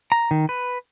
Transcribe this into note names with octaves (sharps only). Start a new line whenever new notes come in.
A#5
D#3
B4